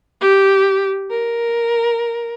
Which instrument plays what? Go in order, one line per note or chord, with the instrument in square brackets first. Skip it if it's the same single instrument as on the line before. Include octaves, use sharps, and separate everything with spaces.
[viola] G4
A#4